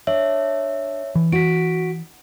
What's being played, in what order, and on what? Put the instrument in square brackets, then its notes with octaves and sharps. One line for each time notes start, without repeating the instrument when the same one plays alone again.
[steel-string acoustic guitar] D4 [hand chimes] C#5 E5
[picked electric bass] E3
[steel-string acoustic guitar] F#4 [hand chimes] B6 D7